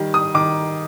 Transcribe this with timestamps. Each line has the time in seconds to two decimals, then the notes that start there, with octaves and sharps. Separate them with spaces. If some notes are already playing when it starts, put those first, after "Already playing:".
Already playing: D#3 G3
0.14 D#6
0.34 D#3 D6